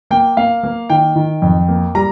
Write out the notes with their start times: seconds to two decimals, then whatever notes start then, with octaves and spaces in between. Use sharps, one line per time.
0.11 A#3 G5
0.37 A#3 F5
0.63 A#3
0.90 D#3 G5
1.16 D#3
1.42 F2
1.68 A#3
1.95 G3 A#5